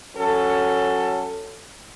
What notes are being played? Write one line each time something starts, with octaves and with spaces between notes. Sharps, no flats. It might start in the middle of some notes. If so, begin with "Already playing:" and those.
F#3 C#4 A4